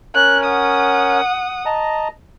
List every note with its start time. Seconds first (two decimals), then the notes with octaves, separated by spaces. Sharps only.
0.15 C#4 A#4 C#5 F#6
0.45 F#5 D#6
1.66 D#5 A5 A#5